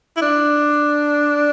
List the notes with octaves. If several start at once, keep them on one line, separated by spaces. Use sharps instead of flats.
E4
D4